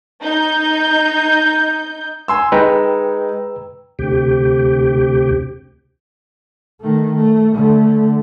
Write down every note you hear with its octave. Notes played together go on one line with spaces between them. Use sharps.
D#4 G6
G#5 C6 E6
G#3 D#4 B4 G5 A#5
D2 C3 G4
D#3 A3
A3
D3 A3